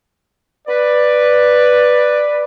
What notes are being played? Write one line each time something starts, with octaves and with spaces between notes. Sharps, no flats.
B4 D5